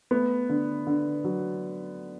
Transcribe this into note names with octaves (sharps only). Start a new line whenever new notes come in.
A3 B3
D3
D3
F#3